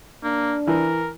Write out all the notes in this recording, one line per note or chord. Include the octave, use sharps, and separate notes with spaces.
A#3 D4
E3 A#4